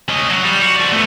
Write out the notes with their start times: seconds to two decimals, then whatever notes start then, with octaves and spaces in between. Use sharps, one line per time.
0.09 C#4 D#5
0.30 F#3
0.43 G3
0.60 F#4
0.75 F3 D5
0.92 A3 B3